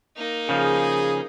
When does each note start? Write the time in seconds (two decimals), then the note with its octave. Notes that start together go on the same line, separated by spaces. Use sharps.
0.17 A#3 D#4
0.49 C#3 F3 G#4